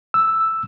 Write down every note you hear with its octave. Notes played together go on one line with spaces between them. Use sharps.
E6